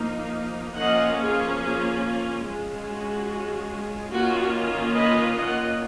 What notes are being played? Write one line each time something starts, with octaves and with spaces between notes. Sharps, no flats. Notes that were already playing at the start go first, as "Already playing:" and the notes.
Already playing: F3 A#3 D#4
F3 A#3 C#4 F4 D#5 F#5
F4 G#4
F4 G#4
F4
G#3 C#4 F4
F#4
D#3 A#3 C#4 F4 F#4
B4 D#5
D#5 F#5